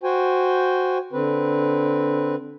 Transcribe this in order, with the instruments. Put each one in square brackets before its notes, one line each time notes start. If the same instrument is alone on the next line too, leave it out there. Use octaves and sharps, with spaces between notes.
[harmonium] F#4 C5 G5 G#5
D3 C4 B4